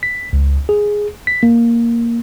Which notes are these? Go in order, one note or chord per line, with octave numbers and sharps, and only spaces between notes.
B6
C#2
G#4
B6
A#3